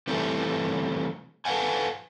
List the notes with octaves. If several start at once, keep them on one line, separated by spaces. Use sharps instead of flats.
C3 E3 G3 A3
A4 B4 C#5 F5 F#5 G#5